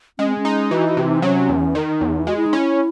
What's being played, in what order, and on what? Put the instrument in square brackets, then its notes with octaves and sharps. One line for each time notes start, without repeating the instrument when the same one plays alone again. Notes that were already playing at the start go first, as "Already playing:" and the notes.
[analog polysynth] G#3 [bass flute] C#4
[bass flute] C4
C#4
[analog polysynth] D#4
[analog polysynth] E3 [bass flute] F#4
[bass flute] F#4
[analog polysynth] C3
[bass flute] D#4
[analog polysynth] F#3 [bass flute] C#4
[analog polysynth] E2
[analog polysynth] D#3 [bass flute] D#4
[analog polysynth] E2
[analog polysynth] G#3 [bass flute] F#4
[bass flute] E4
D#4
[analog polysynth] C#4 [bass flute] E4